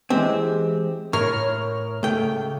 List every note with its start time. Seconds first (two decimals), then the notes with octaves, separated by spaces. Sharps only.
0.10 E3 G#3 C4 G4
1.13 A2 A#4 C#5 F6
2.03 C#2 A3 G5